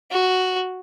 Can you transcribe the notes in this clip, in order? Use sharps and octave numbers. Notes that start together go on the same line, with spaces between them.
F#4